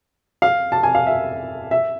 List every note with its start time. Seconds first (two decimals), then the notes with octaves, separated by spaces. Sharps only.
0.42 F5
0.72 A5
0.83 G#5
0.95 F5
1.06 E5
1.71 E5